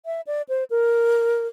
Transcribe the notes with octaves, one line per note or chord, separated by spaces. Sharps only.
E5
D5
C5
A#4